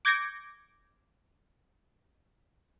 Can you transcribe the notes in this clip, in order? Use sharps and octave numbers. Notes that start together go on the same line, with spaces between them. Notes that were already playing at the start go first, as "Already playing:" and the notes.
D6 G6 G#6 A#6 C#7 D7